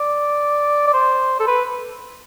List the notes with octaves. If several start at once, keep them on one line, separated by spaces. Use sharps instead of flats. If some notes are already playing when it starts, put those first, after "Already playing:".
Already playing: D5
D5
C5
A4
B4